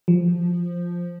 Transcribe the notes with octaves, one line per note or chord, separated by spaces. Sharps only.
F3